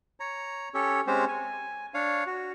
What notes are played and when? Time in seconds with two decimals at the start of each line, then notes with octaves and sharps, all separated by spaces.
0.20 C#5 A#5
0.74 C#4 G4 A4 C#5
1.07 G#3 C4 C#4 G4 C5
1.28 G#5
1.94 D4 C#5 F5
2.27 F#4